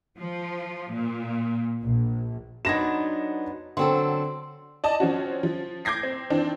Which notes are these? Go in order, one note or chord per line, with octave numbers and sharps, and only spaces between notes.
F3
A#2
A#1
F#3 B3 D4 D#4 F#4 G#6 A#6 E7
D3 F#3 C4 A4 C6
D5 D#5 A5
F3 C4 C#4 F#4
F3
D6 G6 G#6 A#6 C7
C4
D#3 E3 C4 D4